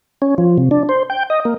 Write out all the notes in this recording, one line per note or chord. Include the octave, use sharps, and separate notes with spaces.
C#4
F3
C3
D4
C5
G5
D#5
A#3